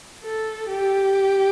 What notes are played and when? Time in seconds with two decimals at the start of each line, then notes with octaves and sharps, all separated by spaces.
0.24 A4
0.69 G4